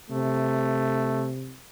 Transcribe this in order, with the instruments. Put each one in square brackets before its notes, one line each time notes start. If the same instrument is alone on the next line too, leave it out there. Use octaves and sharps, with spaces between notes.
[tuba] C3 [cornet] A3